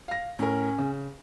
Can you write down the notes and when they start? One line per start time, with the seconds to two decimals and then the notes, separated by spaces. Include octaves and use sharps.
0.08 F5 A#6
0.39 A2 C#4 A#4
0.78 C#3